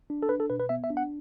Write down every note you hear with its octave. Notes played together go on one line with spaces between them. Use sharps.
D4
A4
D4 B4
A4
B2 B4
B4
B3 E5
E5
D4
F#5